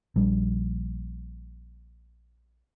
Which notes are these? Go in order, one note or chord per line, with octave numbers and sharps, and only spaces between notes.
A#1 G3